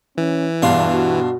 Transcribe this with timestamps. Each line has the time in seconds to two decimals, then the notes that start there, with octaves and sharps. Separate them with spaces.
0.18 E3 C#4
0.62 E2 G2 B2 D4 F5 C6
0.93 F#4